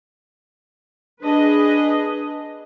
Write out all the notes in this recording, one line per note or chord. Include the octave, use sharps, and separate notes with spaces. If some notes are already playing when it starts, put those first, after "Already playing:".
D4 G#4 B4 D#5